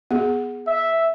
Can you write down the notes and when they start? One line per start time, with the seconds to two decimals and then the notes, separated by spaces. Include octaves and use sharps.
0.11 B3 G#4
0.67 E5